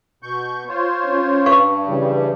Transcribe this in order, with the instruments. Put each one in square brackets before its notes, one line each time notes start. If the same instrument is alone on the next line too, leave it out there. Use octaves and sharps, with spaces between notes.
[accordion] B2 C#6 G6
F4 C5 C#5
[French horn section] C#4
[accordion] G2 [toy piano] B4 F5 C#6
[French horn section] C#3 E3 G3